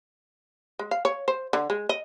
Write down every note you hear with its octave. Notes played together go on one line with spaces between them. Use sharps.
G#3
F5
C#5
C5
D3
G#3
D#5